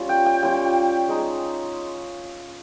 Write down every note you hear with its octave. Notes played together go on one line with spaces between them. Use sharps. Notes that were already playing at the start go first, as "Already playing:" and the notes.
Already playing: G3 C#4 F4
G5
G5
G3 C#4 F4 G5
G#3 D#4